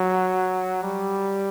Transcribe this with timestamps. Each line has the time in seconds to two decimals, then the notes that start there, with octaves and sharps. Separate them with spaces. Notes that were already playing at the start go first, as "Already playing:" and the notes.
Already playing: F#3
0.83 G3